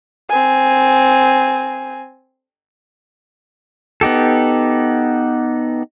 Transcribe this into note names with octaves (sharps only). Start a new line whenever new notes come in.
C4 G#5
B3 D#4 G4 A4